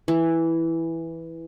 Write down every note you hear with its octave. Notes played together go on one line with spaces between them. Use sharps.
E3